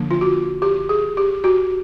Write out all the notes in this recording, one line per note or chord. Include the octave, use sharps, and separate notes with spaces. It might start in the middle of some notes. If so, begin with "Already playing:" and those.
Already playing: D3 F3 A#3 D4
F4
F#4
G4
G#4
G4
F#4